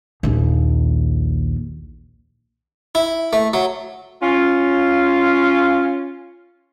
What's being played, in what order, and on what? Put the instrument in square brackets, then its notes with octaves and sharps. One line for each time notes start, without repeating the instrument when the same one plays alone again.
[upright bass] A#1 D#2
[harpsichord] E4
A3
F#3
[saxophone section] C#4 F4